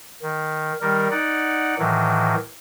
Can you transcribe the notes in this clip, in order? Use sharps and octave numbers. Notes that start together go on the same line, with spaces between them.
D#3
D#3 G3 A#4
D#4 D5 F#5
A2 D#3 E3 F#3